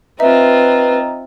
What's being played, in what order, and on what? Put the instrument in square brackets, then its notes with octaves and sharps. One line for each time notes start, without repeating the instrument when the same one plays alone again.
[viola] C4 F4 [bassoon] D#4 [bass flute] B4 [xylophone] E5